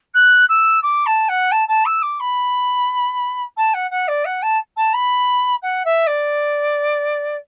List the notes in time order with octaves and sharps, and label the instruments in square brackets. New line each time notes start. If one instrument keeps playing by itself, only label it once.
[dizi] F#6
E6
D6
A5
F#5
A5
A5
E6
D6
B5
A5
F#5
F#5
D5
F#5
A5
A5
B5
F#5
E5
D5